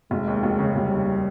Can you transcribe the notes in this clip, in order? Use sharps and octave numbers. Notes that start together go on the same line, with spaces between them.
F1 G#3
D#2
F1
C#3
F1 G3
D#2